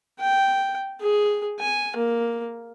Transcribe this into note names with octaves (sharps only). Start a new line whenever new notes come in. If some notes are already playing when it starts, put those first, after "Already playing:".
G5
G#4
G#5
A#3